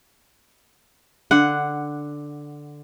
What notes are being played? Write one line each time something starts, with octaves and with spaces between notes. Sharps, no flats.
D3 F#5